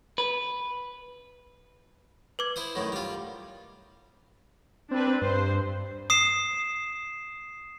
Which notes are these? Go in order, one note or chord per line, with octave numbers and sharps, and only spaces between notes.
B4
B4 D6 G#6
E4 C5 D#6
F#2 A2 D#3
G3 F4
C4 D4 B4
G2 C5
D#6 C7 E7